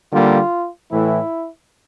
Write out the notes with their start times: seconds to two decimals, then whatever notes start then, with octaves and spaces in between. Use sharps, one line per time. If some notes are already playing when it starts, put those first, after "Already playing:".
0.11 D3 G3 A#3 F4
0.91 A2 E3 A3 E4